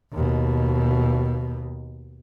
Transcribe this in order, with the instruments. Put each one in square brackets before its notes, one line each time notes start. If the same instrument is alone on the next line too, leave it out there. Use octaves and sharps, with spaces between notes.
[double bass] D#2 B2